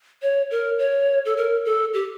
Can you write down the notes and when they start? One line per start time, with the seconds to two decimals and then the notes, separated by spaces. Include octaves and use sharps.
0.22 C#5
0.51 A#4
0.79 C#5
1.25 A4
1.37 A#4
1.65 A4
1.94 G4